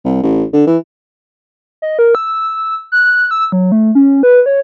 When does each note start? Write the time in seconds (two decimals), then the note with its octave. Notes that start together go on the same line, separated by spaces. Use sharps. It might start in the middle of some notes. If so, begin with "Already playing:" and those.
0.05 C2
0.23 A1
0.53 D3
0.67 E3
1.82 D#5
1.99 A#4
2.15 E6
2.92 F#6
3.31 E6
3.52 F#3
3.72 A3
3.95 C#4
4.23 B4
4.46 C#5